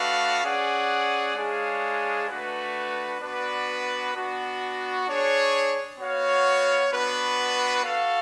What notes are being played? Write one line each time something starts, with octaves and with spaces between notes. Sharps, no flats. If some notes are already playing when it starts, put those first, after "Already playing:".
Already playing: A3 D4 F#4 B4 F5
C#4 G#4 D5 F#5
G#3 D4 G#4 C#5 F5
A3 D4 F#4 B4
B3 D4 F#4 B4 D5
B3 D4 F#4
D4 G#4 C#5
B3 F#4 C#5 F5
B3 D4 F#4 B4
F#4 A4 F5